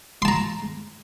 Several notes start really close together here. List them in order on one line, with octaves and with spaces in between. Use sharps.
C6 A5 A#5